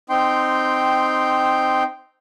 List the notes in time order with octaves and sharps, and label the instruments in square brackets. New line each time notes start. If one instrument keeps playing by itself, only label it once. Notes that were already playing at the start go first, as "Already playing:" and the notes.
[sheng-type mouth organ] C4 D#4 G5 C6